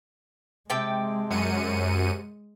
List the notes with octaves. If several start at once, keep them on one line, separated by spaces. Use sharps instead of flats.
C3 G#3 G5 A5
F#2 C#7 D#7